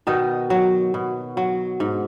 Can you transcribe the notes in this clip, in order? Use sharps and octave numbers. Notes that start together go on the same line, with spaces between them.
B2 D#3 D#4
F#3
B2
F#3
G#2